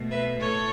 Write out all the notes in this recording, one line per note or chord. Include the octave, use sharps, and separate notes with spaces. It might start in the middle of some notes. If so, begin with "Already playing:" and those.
Already playing: B2 A3
B4 E5
A2 A4 C#5